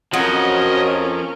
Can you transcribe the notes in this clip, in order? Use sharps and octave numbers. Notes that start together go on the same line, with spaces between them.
F2 F3 F#3 C#4 A#4 D#5